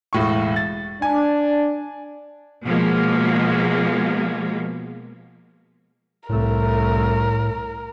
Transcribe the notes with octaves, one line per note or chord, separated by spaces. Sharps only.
E1 A2 C#6
A6
D4 G#5
B2 F3 G#3 A#3
C2 A2 A3 A#4